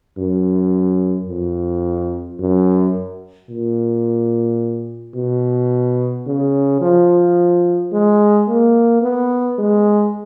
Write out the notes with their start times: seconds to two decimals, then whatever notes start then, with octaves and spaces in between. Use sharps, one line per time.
0.18 F#2
1.29 F2
2.40 F#2
3.50 A#2
5.15 B2
6.27 C#3
6.81 F3
7.93 G#3
8.48 A#3
9.02 B3
9.58 G#3